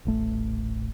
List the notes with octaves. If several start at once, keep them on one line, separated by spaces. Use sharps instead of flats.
D#1 A1 A3